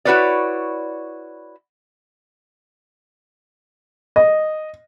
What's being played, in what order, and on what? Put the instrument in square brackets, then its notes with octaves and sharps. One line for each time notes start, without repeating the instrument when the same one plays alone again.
[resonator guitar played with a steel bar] E4 F#4 A#4 B4 C#5 D5
[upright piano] D#5